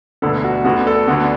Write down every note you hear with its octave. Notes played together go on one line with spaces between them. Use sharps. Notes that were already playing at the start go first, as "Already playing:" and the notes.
E1 D2 D3 B3 A4
F#4
D2 D3 B3 F#4
A4
D2 D3 B3 F#4